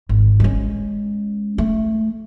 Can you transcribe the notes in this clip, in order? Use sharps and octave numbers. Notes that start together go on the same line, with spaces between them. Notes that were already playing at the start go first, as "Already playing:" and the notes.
G#1
G#3 C#4
A3